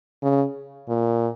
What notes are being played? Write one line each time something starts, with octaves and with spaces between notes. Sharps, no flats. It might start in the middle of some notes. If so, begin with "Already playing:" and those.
C#3
A#2